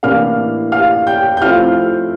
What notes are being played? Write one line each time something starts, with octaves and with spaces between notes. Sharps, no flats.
A2 E3 A#3 D4 F5 F6
F5 F6
G5 G6
G6
F3 A3 C4 E4 F5 F6